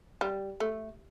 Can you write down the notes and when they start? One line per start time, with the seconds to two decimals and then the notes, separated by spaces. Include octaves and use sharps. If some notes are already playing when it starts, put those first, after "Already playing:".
0.21 G3
0.60 A3